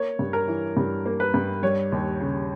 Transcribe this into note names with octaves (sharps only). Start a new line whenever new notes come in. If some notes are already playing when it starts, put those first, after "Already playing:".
Already playing: A#3 C#5
G2
A#4
E3
G2
A#3
B4
G2
G3 C#5
D#2
C#3